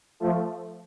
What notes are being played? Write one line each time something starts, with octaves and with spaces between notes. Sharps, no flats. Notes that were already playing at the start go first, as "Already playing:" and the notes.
F3 A3